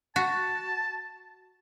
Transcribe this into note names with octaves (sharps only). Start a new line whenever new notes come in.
F#4 A5